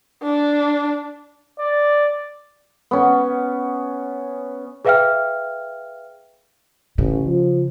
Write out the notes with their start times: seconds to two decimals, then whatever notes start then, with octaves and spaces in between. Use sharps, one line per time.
0.23 D4
1.59 D5
2.91 B3 C#4
4.85 G#4 B4 E5 F5 G5 F6
6.98 A1 C#3
7.26 F3